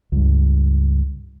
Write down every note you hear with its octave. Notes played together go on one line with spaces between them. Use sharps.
C#2 G2